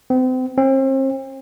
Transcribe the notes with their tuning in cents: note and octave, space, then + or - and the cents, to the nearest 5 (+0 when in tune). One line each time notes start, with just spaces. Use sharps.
C4 -35
C4 +40